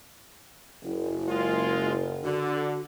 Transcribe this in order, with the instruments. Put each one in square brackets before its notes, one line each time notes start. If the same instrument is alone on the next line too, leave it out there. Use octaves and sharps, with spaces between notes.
[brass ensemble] F#1 [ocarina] E4
[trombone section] G#3 F4
[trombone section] D3 [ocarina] F#4